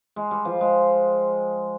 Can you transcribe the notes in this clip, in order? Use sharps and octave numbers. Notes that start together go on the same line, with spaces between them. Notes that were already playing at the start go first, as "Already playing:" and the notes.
G#3
G3
F3
G#3